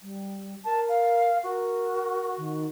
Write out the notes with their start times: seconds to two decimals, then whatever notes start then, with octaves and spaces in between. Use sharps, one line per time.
0.01 G3
0.65 A#4 A5
0.89 F5
1.44 F#4 A#4
2.38 D#3